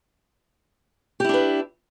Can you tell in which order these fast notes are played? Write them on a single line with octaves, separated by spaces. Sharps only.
G4 E4 D4 B4